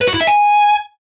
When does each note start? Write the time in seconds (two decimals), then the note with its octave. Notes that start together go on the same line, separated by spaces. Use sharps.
0.01 B4
0.08 F#4
0.14 E4
0.21 E5
0.27 G#5